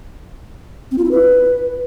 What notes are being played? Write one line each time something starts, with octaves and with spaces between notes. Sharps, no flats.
C4
F4
E4
B4